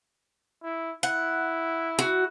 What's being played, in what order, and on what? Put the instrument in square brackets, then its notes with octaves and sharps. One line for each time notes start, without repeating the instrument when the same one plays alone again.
[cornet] E4
[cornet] E4 [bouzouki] F#5
[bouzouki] F#4